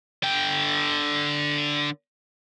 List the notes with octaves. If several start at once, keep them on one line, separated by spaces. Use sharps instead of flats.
D3 G5